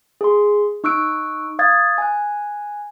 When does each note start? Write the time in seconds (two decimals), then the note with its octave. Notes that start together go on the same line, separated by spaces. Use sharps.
0.21 G#4 C6
0.84 D#4 C#6 E6 F#6 D7
1.59 F5 D#6 G#6 A6
1.98 G#5 F#6